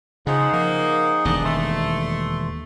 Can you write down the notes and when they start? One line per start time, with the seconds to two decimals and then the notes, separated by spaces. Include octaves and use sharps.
0.27 C#3 F3 D#4 G#4 F#5
0.53 F3 A#3
1.25 E1 D#2 D4 D#5
1.44 A3 C6